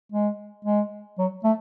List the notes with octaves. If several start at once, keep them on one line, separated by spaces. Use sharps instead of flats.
G#3
G#3
F#3
A3